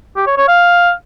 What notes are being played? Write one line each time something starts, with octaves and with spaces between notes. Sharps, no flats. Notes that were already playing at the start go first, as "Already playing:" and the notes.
G4
C#5
C#5
F5